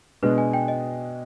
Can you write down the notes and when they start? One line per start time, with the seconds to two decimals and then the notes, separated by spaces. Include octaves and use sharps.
0.23 B2 G#3 D4 B4
0.38 G#5
0.53 G5
0.68 D#5